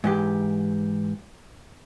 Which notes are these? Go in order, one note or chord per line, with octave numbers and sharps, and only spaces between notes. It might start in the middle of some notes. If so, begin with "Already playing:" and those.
G#2 E3 G4